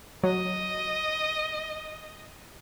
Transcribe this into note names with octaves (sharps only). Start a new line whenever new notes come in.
F#3 D#5